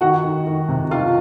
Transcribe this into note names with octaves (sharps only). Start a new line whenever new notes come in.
D#3 F#4 F#5
D#3
D#3
C3
D#3 F4 F5